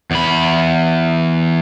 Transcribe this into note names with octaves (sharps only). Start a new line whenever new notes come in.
E2 B5